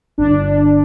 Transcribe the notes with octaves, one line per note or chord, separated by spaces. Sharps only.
G1 D4